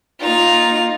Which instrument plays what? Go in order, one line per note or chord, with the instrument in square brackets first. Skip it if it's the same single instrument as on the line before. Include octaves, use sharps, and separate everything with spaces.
[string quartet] A#3 D#4 [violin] F4 F7